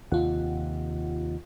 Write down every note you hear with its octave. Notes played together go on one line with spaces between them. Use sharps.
D#2 C3 F4 F#5